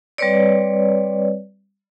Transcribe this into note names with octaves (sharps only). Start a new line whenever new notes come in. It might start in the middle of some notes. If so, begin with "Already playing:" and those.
G3 C4 B4 C#5 D5